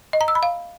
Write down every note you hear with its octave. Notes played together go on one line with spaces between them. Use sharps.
D#5
A#5
E6
B5
F5